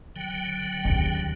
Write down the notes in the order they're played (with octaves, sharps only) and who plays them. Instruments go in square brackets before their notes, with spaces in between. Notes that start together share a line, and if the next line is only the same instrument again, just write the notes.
[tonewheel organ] D3 F#3 G5
[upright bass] D#2 C#3